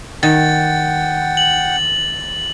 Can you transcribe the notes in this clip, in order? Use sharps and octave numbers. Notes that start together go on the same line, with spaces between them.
D#3 F#5 G5 A6
F#7